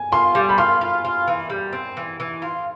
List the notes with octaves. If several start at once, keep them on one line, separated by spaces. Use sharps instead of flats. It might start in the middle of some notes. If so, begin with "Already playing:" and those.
Already playing: G#5
F4 C6
G3
B5
F4 C6
F4
F4
E3
G3
C4
E3
E3
F4